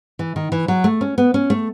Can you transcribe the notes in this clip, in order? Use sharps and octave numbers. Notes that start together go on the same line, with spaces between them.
E3
D#3
E3
F#3
A3
C#4
B3
C#4
A3